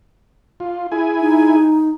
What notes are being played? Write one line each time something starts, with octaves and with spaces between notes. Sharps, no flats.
F4
E4 G#4 G#5
D#4